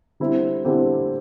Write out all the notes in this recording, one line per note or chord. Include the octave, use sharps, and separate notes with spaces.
D3 G3 C4 E4 G4
D3 G3 C4 E4 G4